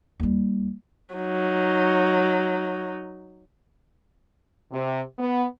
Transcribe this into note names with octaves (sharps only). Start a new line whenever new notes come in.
D#2 G3
F#3 D#4
C3
B3